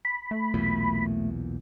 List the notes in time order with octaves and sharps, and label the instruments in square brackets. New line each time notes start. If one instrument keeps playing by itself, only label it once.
[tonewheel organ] B5
[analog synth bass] A3
[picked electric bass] B1 E2 A#2